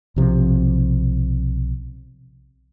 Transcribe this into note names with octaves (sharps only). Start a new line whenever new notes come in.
B1 C3 F3